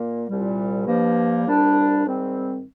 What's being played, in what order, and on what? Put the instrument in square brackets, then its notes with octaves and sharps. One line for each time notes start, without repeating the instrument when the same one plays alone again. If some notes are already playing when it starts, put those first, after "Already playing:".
Already playing: [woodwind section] A#2 A#3
C2 A#2 G3
G2 F3 A#3
C2 A#2 G3 D4
G#2 D#3 G3 C4